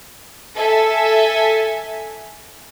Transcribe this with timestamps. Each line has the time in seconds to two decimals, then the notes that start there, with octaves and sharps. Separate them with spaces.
0.57 A4 E5 G#5